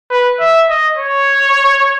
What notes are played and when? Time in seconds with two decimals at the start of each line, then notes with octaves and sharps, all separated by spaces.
0.11 B4
0.40 E5
0.69 D#5
0.97 C#5